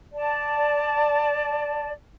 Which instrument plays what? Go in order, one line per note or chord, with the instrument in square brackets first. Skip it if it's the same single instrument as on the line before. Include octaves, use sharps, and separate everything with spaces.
[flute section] D5 A5